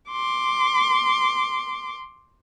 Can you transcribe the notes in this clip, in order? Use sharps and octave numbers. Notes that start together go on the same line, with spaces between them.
C6 D6